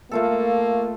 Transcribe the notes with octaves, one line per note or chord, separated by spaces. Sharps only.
A3 A#3 F4 A4